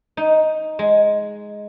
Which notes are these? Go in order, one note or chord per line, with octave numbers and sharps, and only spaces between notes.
D#4
G#3